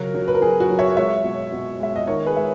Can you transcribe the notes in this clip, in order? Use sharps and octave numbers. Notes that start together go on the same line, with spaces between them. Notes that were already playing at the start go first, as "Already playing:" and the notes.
Already playing: C#3 F#3 F#4 A#4
F#3
B4
A#4
F#3 G#4
F#4
F#3
C#5 E5
G#3 C#5 E5
B2
B2
G#3 E5
D#5
D#3 A#4 C#5
G#4 B4
G#3 E5